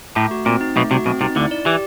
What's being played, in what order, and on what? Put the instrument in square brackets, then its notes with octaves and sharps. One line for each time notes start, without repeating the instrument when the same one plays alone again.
[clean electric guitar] A2 [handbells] A3
[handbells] F#4
[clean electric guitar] A#2 [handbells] C4
[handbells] D#4
[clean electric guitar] B1 B2 [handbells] A3
[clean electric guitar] C2 C3 [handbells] F#4
[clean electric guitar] B1 B2 [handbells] C4
[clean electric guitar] C2 C3 [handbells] D#4
[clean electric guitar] D2 D3 [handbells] E4
[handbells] D5
[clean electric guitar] E3 [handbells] G4